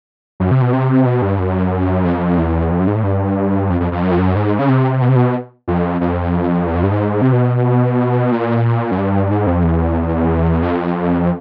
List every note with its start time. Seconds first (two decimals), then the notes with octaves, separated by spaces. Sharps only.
0.40 F#2
0.51 C3
0.62 B2
0.73 C3
1.06 B2
1.22 G2
1.39 F#2
2.04 F2
2.37 E2
2.71 F2
2.79 F#2
2.87 G#2
2.95 A2
3.03 G2
3.70 F2
3.80 F2
3.92 F2
4.03 F#2
4.11 F2
4.19 F#2
4.36 G#2
4.59 C#3
4.69 C3
5.02 B2
5.09 C3
5.16 B2
5.68 F2
6.01 F2
6.67 E2
6.75 F2
6.83 G2
6.91 G#2
7.22 C3
7.33 B2
8.32 A#2
8.91 F#2
8.98 G2
9.31 G#2
9.47 F2
9.63 E2
10.62 F2